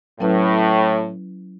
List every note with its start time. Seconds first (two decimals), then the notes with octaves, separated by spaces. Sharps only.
0.20 A2 F#3 C#4 E4 B4